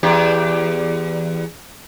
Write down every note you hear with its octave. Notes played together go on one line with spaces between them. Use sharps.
E2 G4